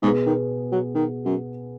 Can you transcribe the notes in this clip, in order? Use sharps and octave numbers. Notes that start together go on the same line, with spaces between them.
G#2 B2 B3 G#4
D#3
F#3
D#3
F#2